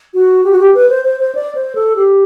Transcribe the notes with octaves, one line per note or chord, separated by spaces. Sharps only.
F#4
G4
F#4
G4
B4
C5
C5
C5
D5
C5
A4
G4